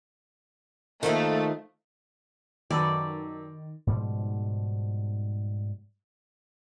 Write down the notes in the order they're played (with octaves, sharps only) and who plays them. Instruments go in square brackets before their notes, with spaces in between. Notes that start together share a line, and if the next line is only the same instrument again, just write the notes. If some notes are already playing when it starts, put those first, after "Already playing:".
[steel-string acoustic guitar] D#3 F3 A#3 [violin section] A3
[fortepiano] F#2 [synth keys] D#3 [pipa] G3 A4 B4 [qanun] D5
[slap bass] G#2 B2 F3 G3